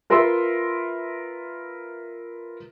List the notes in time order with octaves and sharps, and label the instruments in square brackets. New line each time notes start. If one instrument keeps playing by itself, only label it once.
[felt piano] F4 A#4 B4 E5 C6 E6